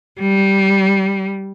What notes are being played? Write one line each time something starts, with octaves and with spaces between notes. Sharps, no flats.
G3